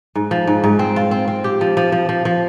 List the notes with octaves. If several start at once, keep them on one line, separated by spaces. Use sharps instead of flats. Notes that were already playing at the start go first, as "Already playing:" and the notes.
G#2
F3
G#2
G#2
C4
F4
C4
C4
G4
F3
F3
F3
F3
F3